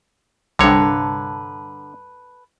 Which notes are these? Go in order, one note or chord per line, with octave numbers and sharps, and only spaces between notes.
C2 G2 D3 A4 B4 C#5 A#5